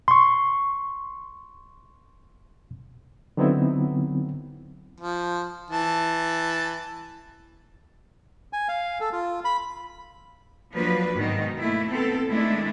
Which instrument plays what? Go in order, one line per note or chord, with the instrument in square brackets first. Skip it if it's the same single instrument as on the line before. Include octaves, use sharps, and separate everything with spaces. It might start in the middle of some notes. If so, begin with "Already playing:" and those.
[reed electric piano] C6 C#6
D3 F#3 B3 C4 D#4 E4
[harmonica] F3
E3 A5
[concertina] G#5
F5
A4
F4
B5
[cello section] F3 F#3 A#3 D4 B4
G#2 B2 D#3 D#4
A3 A#3 E4
B3 C4 A4
D#3 G#3 A3 D4 E4